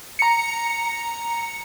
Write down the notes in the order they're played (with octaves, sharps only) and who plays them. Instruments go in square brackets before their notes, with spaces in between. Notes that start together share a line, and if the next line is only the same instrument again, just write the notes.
[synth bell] A#5 C#7